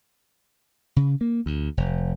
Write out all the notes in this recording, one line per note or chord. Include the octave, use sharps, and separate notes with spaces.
C#3
A#3
D2
F1